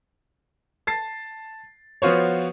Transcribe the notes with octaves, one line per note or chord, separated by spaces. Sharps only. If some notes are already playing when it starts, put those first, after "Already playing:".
A5 A6 C7
F3 B3 F4 F#4 C5 C#5